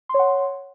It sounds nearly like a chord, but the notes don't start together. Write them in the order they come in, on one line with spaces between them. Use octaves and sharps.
C6 C#5 F#5